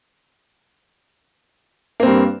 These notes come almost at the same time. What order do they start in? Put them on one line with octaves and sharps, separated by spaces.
A#3 C4 G2